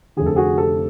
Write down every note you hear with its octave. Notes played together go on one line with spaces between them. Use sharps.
F1 F2 D3 G#4
A4
F#4 G#4
G4 A4